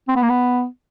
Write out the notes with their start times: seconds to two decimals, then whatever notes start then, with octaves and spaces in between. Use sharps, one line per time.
0.08 C4
0.16 B3
0.23 A#3
0.30 B3